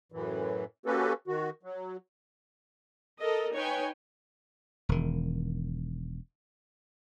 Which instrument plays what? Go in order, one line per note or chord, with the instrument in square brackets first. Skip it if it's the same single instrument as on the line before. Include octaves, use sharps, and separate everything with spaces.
[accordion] F#2 A2 E3
A#3 C#4 F#4 G4 A4 B4
D#3 F#4
F#3
[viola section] A4 A#4 D#5
D#4 B4 C#5 G5 G#5
[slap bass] E1 D#3